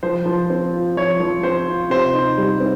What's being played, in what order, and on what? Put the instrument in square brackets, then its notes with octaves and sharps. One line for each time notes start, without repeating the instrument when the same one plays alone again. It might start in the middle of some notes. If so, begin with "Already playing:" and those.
[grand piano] F3 [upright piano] C5
[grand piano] F3
C4
F4
[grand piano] F3 [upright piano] C#5
[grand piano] F3
[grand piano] C4 [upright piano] C5
[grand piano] F4
[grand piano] C3 [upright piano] C5
[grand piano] D#4
G3
C4